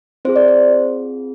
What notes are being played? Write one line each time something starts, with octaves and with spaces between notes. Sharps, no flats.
C4 F4 G#4 C5
D5
C5